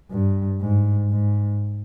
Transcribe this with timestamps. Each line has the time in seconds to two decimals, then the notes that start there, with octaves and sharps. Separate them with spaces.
0.12 G2
0.61 G#2
1.10 G#2